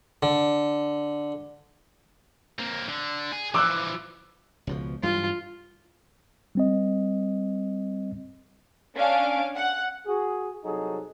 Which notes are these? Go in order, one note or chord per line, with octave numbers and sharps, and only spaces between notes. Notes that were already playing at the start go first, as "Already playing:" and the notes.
D3
A#3 C4
D3
G#4
E3 F3 D6 E6 F#6
C#2 B2 F3
G2 E3 F#3 F4
G3 C4 D#5
C#4 D4 F5 D7
F#5
F#4 G#4
C2 F#3 D#4 G#4 A4